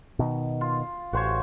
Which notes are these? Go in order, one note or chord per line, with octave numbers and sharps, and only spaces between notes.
B2 D#3
F4
A1 F#4 C5 C#5